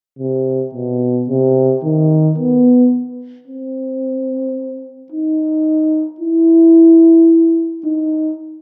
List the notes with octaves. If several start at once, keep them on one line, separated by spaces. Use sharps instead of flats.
C3
B2
C3
D#3
B3
C4
D#4
E4
D#4